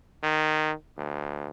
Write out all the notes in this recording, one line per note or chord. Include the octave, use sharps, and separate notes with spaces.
D#3
D2